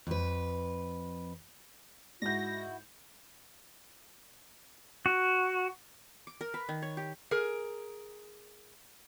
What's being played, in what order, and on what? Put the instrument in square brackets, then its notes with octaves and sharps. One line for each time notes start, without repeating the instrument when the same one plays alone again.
[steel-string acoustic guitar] F2 B4
[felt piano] G#2 G6 [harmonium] E4 F#4 [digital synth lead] A#6
[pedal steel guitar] F#4
[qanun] D6
A#4
B4
D#3
C#5
G4
[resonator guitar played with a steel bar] G#4 A#4